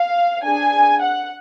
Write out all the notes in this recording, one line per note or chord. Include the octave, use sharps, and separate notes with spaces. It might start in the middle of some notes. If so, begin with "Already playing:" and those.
Already playing: F5
D4 G#4 G#5
F#5